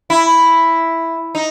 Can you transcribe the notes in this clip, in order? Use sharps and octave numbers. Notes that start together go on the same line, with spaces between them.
E4
D#4